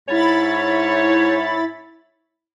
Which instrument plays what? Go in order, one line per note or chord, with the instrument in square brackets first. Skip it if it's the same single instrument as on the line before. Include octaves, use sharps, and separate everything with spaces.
[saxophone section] G#2 C#4 C#5 [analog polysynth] E4 B5 A6